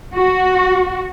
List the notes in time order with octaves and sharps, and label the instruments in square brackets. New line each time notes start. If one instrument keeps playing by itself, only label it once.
[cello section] F#4